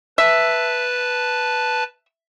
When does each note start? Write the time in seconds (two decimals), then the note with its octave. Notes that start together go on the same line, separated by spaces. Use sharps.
0.18 B4 E5 A5